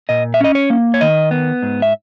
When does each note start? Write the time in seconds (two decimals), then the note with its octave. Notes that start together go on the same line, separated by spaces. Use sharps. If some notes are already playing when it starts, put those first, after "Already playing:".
0.09 A#2 D#5
0.34 E5
0.40 C#4 D#5
0.55 C#5
0.70 A#3
0.94 C#5
1.01 D#3 D#5
1.31 B3
1.62 G#2
1.82 E5